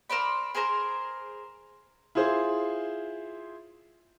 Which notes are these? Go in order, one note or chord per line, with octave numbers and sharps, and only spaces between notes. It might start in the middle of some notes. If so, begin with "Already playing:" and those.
A#4 C5 D5 B5
G#4 A#4 C5 A#5
E4 F4 G#4 C5